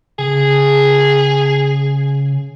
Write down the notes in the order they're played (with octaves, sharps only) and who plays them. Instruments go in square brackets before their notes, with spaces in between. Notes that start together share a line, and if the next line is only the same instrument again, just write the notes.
[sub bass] C#3 [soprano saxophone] G#4